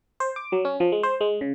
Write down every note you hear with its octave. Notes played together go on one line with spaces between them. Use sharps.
C5
D6
F#3
C#4
F3
G#3
C5
G#3
C#3